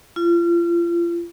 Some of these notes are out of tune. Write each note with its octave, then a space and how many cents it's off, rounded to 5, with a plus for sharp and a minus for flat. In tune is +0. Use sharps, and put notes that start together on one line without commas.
F4 -35